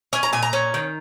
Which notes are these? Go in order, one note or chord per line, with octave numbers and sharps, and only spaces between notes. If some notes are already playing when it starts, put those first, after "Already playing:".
C#4 G#5
A#5
A#2 G#5
A#5
C#4
D#3